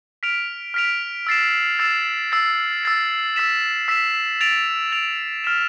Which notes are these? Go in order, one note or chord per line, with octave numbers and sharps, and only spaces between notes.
F6 B6 D7 F7
F6 B6 D7 F7
E6 A6 C7 E7
E6 A6 C7 E7
E6 A6 C7
E6 A6 C7
E6 B6 E7
E6 B6 E7
A6 D7 F7
A6 D7 F7
F6 B6 E7